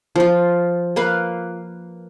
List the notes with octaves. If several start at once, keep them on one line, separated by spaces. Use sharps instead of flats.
F3 F4
A#3 B4 F5